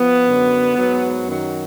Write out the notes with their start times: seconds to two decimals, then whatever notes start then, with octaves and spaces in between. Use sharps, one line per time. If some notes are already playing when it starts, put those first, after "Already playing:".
Already playing: F3 B3
0.27 F#2 D3 F#3
0.76 G#2 F#3
1.27 F#2 D#3 F#3